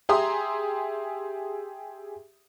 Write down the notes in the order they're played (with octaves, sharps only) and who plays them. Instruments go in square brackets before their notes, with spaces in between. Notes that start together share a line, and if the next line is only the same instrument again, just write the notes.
[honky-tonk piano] G4 G#4 E5 A#5 C6 D#6